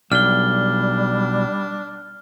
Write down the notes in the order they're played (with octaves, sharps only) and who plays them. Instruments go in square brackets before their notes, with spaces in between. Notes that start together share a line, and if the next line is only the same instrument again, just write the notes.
[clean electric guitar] B1 [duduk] G3 [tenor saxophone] D4 [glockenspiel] F6 G7